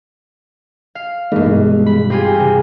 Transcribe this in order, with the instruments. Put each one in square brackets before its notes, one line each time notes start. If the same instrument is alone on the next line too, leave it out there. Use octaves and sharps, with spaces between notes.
[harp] F5
[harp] G2 E3 [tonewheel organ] G#3 A#3 D#4
[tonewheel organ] B2 G#3
[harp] B5
[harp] C4 F4 G#4 [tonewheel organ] G4
[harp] C3